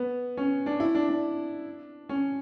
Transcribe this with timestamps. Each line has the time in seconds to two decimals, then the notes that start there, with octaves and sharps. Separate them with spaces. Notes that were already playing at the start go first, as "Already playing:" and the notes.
Already playing: B3
0.37 C#4
0.66 D4
0.80 E4
0.95 D4
1.09 D4
2.09 C#4